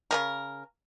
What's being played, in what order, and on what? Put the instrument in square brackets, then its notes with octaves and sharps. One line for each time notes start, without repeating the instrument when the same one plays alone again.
[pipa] C#3 G#3 A#4